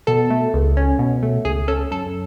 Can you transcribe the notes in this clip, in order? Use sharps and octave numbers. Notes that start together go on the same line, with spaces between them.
B2 A4
A3
C#2
C#4
B2
A3
C#2 G#4
C#4 A4
F#2 A4